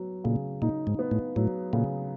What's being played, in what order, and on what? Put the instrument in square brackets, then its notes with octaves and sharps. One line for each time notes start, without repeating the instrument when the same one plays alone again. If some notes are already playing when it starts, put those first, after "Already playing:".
Already playing: [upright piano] F#3 B3
[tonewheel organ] A#2 [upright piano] C#3
[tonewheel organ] A#2 [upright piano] D#4
[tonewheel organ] G#2
[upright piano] B3
[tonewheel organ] A2
[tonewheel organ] A2 [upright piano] F#3
[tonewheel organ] A#2 [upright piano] C#3